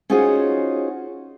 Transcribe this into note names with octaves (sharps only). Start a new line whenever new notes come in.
C#4 D#4 F4 F#4 G#4 C5